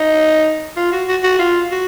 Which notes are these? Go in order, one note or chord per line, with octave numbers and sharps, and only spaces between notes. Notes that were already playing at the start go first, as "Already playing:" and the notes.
Already playing: D#4
F4
F#4
F#4
F#4
F4
F#4